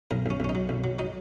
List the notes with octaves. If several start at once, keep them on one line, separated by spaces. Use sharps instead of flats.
B1 A#4
B1 C#4
B1 C#4
D#4
F#3
B1
F#3
F#3 D#4